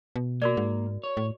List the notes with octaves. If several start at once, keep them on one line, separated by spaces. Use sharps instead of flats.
B2
A#3 F#4 A#4 D5
G#2
C#5
A2